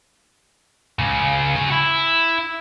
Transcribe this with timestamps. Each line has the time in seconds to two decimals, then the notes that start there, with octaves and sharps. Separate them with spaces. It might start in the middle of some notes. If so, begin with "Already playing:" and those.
0.99 C#2 C#3
1.56 F#4 G#5
1.71 E4